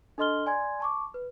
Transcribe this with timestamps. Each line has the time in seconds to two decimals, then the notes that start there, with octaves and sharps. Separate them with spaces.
0.18 D4 A4 D#5 C6 F6 G7
0.46 D5 G#5 C6 G#6
0.80 A5 C#6 D6
1.14 B4